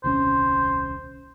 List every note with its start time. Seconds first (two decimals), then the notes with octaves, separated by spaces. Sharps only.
0.04 D#1 C2 C#4 C5